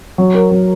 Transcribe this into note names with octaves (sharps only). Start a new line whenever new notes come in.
F#3
A#4
F#3